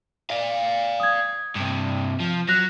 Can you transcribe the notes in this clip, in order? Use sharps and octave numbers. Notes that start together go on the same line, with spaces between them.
D5 F5
D#6 G#6
G2 C3
F3
F#3 F#6 A#6